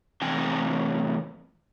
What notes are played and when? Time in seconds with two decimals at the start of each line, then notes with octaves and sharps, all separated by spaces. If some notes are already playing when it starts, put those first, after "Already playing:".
0.22 A2 C3 E3 C4 G5 G#5